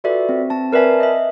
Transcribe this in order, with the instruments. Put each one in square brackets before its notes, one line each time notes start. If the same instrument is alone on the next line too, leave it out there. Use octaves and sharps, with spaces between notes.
[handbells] F4 F#4 A4 B4 D5 E5
C4
C4 A5
A#4 B4 D5 E5 G#5 A5
D#5 E5